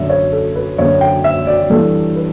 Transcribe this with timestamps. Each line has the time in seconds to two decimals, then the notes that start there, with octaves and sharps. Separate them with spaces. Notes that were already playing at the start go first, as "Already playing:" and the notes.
Already playing: F#2 D3 E5
0.10 C#5
0.32 A4
0.56 B4
0.78 F#2 D3 C#5
1.01 G5
1.24 E5
1.47 D5
1.70 G2 E3 A4
2.16 B4